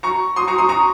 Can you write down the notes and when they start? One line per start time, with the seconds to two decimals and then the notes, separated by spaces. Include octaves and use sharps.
0.03 A#5 C#6
0.36 C6 D#6
0.48 A#5 C#6
0.58 C6 D#6
0.69 A#5 C#6